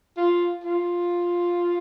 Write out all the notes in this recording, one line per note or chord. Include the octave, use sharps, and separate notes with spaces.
F4
F4